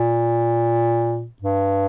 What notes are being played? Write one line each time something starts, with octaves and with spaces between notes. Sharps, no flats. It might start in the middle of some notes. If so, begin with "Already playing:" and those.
Already playing: A#2
G2